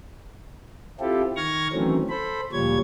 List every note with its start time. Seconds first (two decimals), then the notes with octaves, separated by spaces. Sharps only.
1.00 C4 E4 F4 G4 A4
1.36 D#3 C#6 F6 G#6 A#6
1.73 D#3 E3 F#3 A3 C4 C#4
2.09 A4 C5 B5
2.52 D2 A#2 F3 G3 C#5 G#6